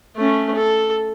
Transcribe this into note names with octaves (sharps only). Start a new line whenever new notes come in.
A3 C#4
A4